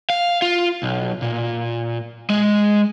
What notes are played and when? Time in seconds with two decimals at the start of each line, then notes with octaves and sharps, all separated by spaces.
0.10 F5
0.42 F4
0.83 B1
1.22 A#2
2.30 G#3